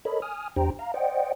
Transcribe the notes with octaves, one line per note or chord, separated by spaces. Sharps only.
A4 A#4 C#5 D#5 B5
G#5 D#6 F6
E2 D4 G4 C5 G5 A#5
F5 A#5
C5 D5 D#5 F#5 G5